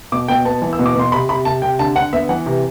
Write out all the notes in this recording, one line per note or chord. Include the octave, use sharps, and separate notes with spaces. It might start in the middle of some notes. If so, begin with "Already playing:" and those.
B2 D6
B2 G5
B3 A5
E3
E6
B2
D6
B2 C6
C3 B5
C3 B5
C3 A5
C3 G5
D3 A5
D3 F#5
B3 E5
E3 F#5
C3